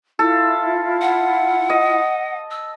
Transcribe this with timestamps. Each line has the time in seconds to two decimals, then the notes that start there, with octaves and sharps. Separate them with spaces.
0.19 E4 F4 A4
1.01 F#5
1.70 D#5
2.51 E6